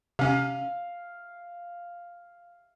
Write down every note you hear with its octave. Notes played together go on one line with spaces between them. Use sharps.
C3 C#4 F5